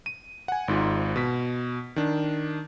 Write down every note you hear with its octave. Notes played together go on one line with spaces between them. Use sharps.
D#7
F#5 G#5
G#1 G#2 F4
B2 B6
D#3 D4